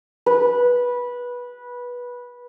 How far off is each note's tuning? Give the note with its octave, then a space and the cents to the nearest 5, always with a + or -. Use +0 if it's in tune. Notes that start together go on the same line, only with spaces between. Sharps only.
B4 -15